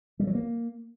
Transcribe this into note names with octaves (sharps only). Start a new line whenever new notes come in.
G3
F#3
A#3